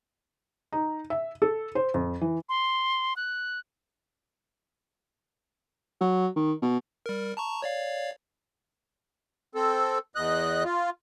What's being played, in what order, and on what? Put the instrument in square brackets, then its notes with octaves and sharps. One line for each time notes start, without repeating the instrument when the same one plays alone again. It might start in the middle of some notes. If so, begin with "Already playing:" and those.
[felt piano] D#4
E5
A4
C5
F2
E3
[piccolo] C6
F#6
[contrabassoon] F#3
D#3
B2
[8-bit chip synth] G3 A#4
A5 A#5 C#6
C#5 D5 F5
[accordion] C4 A4
E2 D#5 F#6
F4